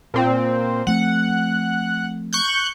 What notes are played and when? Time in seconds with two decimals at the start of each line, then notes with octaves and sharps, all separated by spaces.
0.14 A#2 C4
0.87 F3 A3 C4 F#5
2.33 C#6 F#6 G6